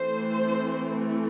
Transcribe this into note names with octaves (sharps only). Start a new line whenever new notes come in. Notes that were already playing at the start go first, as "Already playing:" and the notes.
Already playing: E3 A3 C4 C5